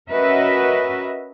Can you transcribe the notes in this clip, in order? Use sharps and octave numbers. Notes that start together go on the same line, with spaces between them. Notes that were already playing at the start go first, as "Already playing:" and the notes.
C#4 F#4 A#4 B4 D#5 E5